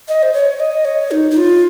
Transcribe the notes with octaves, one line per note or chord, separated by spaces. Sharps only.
D#5
C5
C#5
D#5
C#5
D#4
D#4
F4